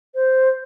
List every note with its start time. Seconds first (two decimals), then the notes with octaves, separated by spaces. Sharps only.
0.15 C5